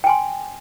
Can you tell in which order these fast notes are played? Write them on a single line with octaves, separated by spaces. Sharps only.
G5 G#5 C6